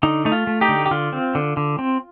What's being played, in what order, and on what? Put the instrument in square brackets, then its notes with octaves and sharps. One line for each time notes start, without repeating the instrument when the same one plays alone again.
[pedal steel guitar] D3 D#4
A3 D#4
F4
A3
D#4 G4
D3
G4
D3 F4
C4
D3
D3
C4